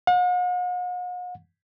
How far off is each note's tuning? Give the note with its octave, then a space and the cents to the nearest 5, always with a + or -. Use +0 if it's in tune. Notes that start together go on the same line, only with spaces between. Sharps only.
F#5 -45